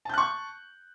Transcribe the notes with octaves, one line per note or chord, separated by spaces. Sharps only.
A5 C#6 F#6 G6